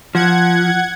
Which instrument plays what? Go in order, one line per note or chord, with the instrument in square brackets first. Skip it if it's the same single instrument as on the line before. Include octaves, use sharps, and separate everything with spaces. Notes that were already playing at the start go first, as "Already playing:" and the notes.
[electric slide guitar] F3 [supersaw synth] F#5 G#6